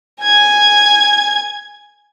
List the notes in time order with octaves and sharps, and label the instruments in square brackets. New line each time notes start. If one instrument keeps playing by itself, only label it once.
[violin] G#5 G#6